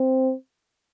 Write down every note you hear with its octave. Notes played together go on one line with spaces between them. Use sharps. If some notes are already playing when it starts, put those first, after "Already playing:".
Already playing: C4